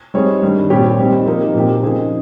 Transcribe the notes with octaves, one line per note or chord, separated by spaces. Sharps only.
G3 C4 D#4 G#4 C#5
G2 D#3 G3
A#2 G3 C4 G4 C#5
G3 C4 D#4
F3 A#3 D#4 G4 A#4
A#2 F3 C4 G4 A#4
C#3 F3 C4 D#4 G#4